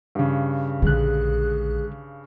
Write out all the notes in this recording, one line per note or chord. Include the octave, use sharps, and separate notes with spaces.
G2 C#3
A#1 D3 G#3 G#4 F#6